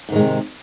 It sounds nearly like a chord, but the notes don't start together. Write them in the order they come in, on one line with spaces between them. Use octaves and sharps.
G#2 D#3 G#3 C3